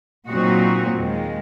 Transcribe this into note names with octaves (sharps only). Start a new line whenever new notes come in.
A#2 F#3 C4 D#4 F#4
D#2 D#3 G#3